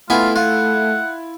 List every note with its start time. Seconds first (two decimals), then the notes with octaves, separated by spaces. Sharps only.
0.10 A3 B3 E4 F4 G#5
0.36 F4 F#5